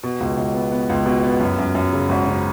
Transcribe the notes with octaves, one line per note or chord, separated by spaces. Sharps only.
B2
C#2
C#2
B3
B3
C#2
B2
B3
F#2
F#2
F#2
C#3
G#1
C#3